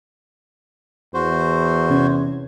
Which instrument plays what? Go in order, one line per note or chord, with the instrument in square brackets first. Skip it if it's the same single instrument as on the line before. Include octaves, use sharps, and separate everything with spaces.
[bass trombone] E2 [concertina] F#4 C5
[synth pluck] C3 C#4 G#6